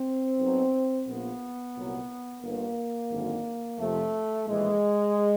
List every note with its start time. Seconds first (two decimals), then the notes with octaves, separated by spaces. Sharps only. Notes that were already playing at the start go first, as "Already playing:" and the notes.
Already playing: C4
0.38 B1 B2 F#3
1.06 A#1 A#2 F3 B3
1.75 C2 A#2 F#3
2.42 G1 G2 D3 A#3
3.10 G#1 F#2 D3
3.78 F2 C3 F3 A3
4.47 A#1 A2 E3 G#3